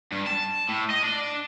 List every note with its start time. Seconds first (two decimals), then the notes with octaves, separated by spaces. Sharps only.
0.12 G2
0.26 A5
0.69 A2
0.90 D#5
1.03 D4